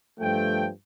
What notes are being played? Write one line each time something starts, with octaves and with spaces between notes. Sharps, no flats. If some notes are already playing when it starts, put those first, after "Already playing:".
G2 F3 A3 G5